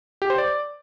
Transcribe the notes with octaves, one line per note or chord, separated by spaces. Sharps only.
G4
C5
D5